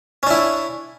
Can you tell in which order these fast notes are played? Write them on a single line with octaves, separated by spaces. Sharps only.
C#4 D4 E4